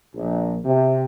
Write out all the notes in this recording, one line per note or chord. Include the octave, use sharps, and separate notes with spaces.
A#1
C3